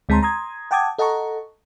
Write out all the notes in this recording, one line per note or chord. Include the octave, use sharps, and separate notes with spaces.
D2 G#3 C4 A5 A#5 C6
A#5 C6 D#6 G#6
F#5 G5 A5 D6 D#6 G#6
A4 D#5 F#5 A5 A#5 C#6